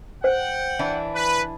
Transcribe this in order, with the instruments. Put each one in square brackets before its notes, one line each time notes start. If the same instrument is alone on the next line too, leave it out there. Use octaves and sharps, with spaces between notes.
[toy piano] C5 [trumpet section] F#5 G5
[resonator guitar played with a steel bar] E3 D4 E4
[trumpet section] B4